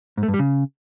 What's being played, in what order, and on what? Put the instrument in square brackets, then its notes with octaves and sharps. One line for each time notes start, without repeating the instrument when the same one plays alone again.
[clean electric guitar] G#2
A3
G2
G3
C#3